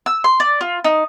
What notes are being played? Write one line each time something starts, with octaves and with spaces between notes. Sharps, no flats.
E6
C6
D5
F4
D#4